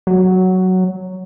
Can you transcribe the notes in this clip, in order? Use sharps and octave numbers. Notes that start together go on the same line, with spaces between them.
F#3